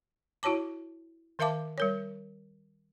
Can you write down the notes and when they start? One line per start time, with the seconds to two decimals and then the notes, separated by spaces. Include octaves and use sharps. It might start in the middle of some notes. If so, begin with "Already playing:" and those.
0.43 E4 F#4 C#5 A5 D6
1.39 D#3 A#4 E5 F5 A5 D6
1.78 G3 A#4 C#5